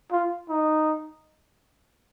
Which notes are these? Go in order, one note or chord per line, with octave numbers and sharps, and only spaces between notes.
F4
D#4